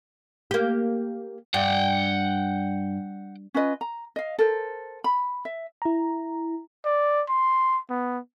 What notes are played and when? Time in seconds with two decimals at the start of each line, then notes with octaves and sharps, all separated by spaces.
0.51 A#3 G4
1.54 G2 F#5 G5
3.54 C#4 F4 B4 D#5
3.81 A#5
4.16 D#5 F5
4.39 A4 A#4 C5
5.04 B5
5.45 E5
5.82 E4 A#5
6.85 D5
7.29 C6
7.90 B3